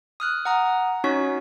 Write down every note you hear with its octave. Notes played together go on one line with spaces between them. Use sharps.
D#6 F6 F#6
F#5 A#5 D#6
C#4 D#4 F#4 C#5 C#6 B6